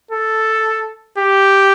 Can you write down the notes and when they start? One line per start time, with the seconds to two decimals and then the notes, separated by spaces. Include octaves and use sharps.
0.11 A4
1.18 G4